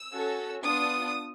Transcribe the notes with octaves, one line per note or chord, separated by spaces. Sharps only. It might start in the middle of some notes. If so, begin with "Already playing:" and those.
Already playing: E6
C#4 F#4 A4
B3 D4 F4 D#6